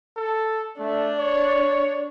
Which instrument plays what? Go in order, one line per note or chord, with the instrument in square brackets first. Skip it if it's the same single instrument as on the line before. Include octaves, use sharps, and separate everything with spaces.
[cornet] A4
[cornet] A3 [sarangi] D4
[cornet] C#5